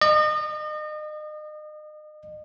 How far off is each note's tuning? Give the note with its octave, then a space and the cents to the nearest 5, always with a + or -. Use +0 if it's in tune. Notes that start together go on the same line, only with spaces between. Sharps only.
D#5 -35